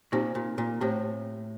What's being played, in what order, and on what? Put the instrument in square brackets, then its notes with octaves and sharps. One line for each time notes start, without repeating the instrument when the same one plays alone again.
[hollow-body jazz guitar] A#2 [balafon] C4 D#4 G4 C5
[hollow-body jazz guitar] A#2
A#2
[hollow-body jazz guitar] A2 [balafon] C4 G4 C5